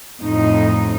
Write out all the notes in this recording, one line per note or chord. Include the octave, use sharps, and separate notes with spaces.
F2 A2 D#4